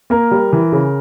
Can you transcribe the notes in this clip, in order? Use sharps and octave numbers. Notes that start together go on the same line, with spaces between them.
A#3 A#4
G3
E3
C#3